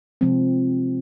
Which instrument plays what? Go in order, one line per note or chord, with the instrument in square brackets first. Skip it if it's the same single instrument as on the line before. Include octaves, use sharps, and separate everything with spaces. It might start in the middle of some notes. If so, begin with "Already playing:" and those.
[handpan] C3 F3 G#3 C4